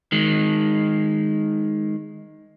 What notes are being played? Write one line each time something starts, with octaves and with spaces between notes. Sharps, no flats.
D#3 G#3